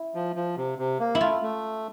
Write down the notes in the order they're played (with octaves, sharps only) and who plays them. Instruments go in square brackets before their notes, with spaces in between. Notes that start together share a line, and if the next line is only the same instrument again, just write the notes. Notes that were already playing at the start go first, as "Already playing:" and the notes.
Already playing: [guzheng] E4
[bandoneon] F3
F3
C3
C3
A#3
[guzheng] E4
[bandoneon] A3 [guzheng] F4
[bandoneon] A3